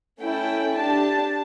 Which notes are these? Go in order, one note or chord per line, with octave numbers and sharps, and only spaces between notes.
A3 C#4 E4 A4 G5
D4 G4 A5